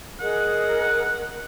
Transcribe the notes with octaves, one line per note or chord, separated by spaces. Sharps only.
G#4 A#4 D#5 F#5